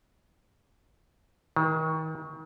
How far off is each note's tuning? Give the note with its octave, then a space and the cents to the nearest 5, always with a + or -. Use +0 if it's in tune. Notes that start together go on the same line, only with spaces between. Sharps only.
D#3 +35